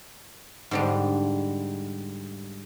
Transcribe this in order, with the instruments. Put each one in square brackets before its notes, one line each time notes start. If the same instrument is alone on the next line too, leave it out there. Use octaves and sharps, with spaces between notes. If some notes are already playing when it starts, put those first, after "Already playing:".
[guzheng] G#2 D3 G3